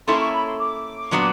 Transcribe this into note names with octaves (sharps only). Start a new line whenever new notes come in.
A#3 C#4 E4 A4 C#5 C6
C#6
B5
C6
D6
A#2 F#3 B3 D4